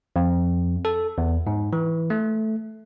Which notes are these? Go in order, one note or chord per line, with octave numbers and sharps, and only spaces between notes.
F2
A4
E2
G#2
E3
A3